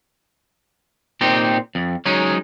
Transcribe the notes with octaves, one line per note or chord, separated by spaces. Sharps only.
A#2 C4 D#4 G4
F2
F#3 G#3 C#4 D#4